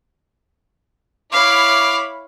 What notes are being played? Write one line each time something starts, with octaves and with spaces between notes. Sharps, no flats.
E4 C#5 F5 B5 D6